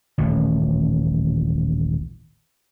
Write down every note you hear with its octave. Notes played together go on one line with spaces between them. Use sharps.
D#1 A1